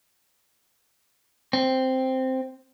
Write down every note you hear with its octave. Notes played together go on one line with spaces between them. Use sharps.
C4